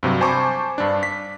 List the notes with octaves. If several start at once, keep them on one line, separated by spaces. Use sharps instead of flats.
G2 C3 F#3
C5 G#5 A5 B5 C#6 D6
G2 D4
B6